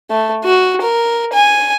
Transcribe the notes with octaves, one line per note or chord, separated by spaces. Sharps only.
A3
F#4
A#4
G#5